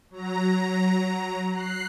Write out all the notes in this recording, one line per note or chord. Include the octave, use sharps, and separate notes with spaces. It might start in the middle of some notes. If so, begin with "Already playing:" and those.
F#3 A#5
F#6 C7